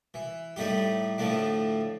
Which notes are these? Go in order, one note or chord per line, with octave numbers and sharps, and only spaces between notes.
E3
A2 G3 A3 D#4 G4
A2 D3 F3 A3 D4